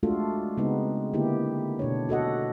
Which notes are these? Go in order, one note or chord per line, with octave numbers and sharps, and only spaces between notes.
G#3 A3 D4 F4 F#4 A4
C#3 G#3 B3 C4 D#4 B4
D3 A#3 B3 E4 G4
B2 D4 C#5
F#4 A4 D#5 F#5